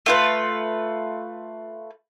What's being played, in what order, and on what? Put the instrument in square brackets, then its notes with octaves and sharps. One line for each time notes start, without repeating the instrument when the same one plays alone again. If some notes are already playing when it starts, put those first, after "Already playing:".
[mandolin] A3 F4 B4